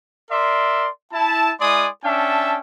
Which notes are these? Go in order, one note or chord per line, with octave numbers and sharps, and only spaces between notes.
A#4 D5 E5 C6
E4 A5
G#3 E4 D5 G#5 C6 D#6
C#4 D4 E5 G5 A5